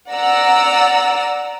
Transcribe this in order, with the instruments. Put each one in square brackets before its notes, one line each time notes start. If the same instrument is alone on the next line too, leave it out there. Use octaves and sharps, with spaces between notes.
[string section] D5 F#5 A#5 E6